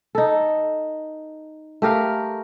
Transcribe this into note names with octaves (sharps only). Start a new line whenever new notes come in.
D#4 A4
A3 G4 A#4 F5